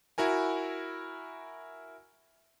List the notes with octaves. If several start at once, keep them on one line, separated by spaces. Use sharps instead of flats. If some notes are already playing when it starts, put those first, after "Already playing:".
E4 F#4 A#4 G#5